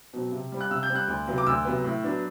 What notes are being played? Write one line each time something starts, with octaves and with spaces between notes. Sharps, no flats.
B2 F#3 C4
C3
G3 C4
F#6
C3 E6
G6
G3 C4
F#6
D2
C3 F#3 B3
D6
D2 E6
C3 F#3 B3
A2
F#3 B3 D4